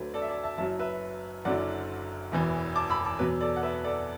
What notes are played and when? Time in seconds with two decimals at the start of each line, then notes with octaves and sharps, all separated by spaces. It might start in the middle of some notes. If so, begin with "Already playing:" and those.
Already playing: D2 D3 F#3 B4
0.14 A4 D5
0.22 E5
0.28 A4 D5
0.43 E5 A5
0.58 F#1 F#2 F#3 E5 A5
0.79 B4 E5
1.45 F#1 F#2 D3 F#3 D5 F#5
2.32 E1 E2 E3
2.76 A5 D6
2.90 B5 E6
3.05 A5 D6
3.19 E2 B2 F#3 B4
3.41 A4 D5
3.56 F#5
3.63 B4 E5
3.84 A4 D5